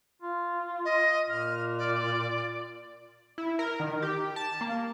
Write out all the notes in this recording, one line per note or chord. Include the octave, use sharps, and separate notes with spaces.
F4
D#5
A#2 F6
D5
E4
A#4
D#3
G4
A5
A#3